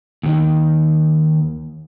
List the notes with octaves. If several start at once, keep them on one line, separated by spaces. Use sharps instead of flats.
D#2 D#3